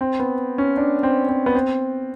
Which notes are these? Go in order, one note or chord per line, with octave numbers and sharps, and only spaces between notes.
C4
B3
C#4
D4
C4
C4
B3
C4